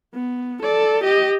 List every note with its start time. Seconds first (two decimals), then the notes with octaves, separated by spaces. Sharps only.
0.14 B3
0.62 A4 D5
1.04 G4 D#5